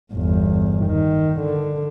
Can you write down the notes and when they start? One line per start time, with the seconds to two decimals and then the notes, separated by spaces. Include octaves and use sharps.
0.13 G1 E2
0.86 D#3
1.40 D3